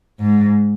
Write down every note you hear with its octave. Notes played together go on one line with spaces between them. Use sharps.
G#2